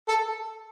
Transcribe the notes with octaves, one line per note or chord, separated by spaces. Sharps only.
A4